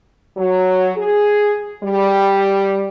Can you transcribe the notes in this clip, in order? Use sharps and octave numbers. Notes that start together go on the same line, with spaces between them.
F#3
G#4
G3